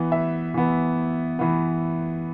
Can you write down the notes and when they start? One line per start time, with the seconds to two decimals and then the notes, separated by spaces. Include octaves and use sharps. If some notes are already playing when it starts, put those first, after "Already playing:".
Already playing: E3 B3
0.12 E5
0.54 E3 B3
1.39 E3 B3